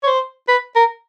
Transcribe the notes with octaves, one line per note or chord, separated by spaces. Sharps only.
C#5
C5
B4
A#4